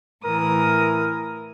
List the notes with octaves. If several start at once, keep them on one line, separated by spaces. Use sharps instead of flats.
A2 E3 A#4 D#6